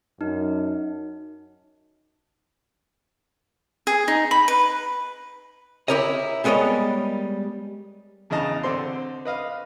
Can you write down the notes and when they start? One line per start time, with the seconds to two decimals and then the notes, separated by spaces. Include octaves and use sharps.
0.21 F#2 D#4
3.87 G#4
4.08 D#4
4.31 B5
4.48 B4
5.88 E4 G4 A#4 C#5 D#5
6.44 G3 G#3 B3 A#4 C#5 D#5
8.30 E2 C#3 E3 D#5 A5 A#5
8.63 D3 C4 C6
9.25 B4 D#5 F5